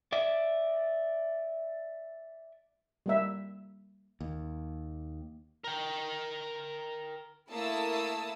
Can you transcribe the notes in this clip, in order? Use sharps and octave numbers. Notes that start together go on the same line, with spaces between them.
D5 E5
G3 A#3 E5
D#2
A#4 G5
A3 A#3 E4 A5 D#6 E6